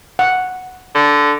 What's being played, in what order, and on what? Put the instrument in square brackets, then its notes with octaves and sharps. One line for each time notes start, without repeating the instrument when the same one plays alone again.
[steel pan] F#5
[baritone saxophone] D3